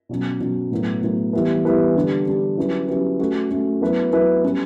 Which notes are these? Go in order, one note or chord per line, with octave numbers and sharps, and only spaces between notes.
B2 F#3 C#4
B2 F#3 C#4
A2 F#3 B3
A2 F#3 B3
E3 G3 B3 E4 B4
E3 G3 B3 E4 B4
D3 G3 D4 G4
D3 G3 D4 G4
F#3 C#4 E4 G4 B4
F#3 C#4 E4 G4 B4
A3 C#4 F#4 A4
A3 C#4 F#4 A4
F#3 B3 E4 B4
F#3 B3 E4 B4
G3 C#4 G4 B4